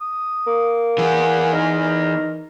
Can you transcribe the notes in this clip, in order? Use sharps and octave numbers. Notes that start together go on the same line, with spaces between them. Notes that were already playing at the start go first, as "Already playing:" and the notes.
D#6
A#3
E3 G#4 F#5
D#4 A#4